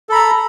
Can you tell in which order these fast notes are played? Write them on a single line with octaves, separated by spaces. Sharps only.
A4 B5 A#5